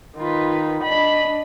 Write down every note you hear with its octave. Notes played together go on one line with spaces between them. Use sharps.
D#3 F4 B4
D4 D#5 B5